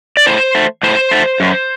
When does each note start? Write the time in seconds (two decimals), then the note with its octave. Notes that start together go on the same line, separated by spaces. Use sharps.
0.17 D5
0.26 A2 C5
0.55 A3
0.83 A2 C5
1.11 A3
1.40 F#2